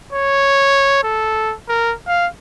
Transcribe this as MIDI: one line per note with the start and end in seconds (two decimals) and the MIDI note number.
0.12 1.03 73
1.03 1.54 69
1.69 1.94 70
2.07 2.27 77